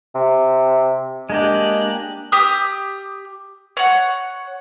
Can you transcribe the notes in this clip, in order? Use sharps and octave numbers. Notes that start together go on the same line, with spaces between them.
C3
G#3 A#3 D4 G4 D#5 F#6
G4 D#6 E6
C#5 F#5